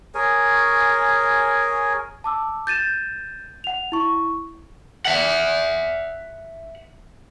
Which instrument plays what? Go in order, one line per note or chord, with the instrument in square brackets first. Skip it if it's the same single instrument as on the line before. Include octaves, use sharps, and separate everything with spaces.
[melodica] G#4 A#4 C#5 G#5
[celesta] A5 D6 E6
G6 A6 D#7 E7
F#5 F7
E4 C#6
[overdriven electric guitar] E5 F#5